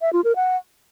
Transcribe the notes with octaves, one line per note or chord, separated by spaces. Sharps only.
E5
F4
A#4
F#5